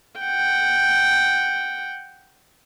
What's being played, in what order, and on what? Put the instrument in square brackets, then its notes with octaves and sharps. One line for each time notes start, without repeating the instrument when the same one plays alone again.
[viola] F#5 G5